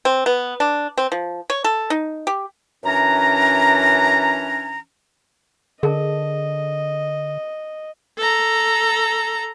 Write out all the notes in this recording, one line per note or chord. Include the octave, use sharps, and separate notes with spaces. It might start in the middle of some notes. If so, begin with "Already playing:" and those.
C4
B3
D4
C4
F3
C#5
A4
D#4
G4
F#2 E3 C#4 D4 A#5
D3 G#4 A#4 D#5 A5
A4 A#5